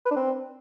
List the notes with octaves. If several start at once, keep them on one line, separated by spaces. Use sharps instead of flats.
B4
D4
C4